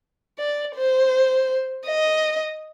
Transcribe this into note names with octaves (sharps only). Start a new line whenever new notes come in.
D5
C5
D#5